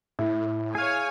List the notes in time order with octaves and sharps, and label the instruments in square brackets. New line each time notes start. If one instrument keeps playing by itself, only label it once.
[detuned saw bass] A2 [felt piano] E4
[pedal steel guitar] G#4 F5 [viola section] C#5 G#5